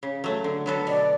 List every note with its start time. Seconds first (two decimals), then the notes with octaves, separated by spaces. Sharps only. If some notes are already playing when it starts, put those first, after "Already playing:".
0.03 C#3
0.24 F#3 A3
0.44 D3
0.66 F#3 B3 F#4 A4
0.87 B2 D5